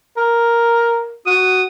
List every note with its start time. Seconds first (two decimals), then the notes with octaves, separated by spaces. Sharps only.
0.17 A#4
1.26 F#4 D#6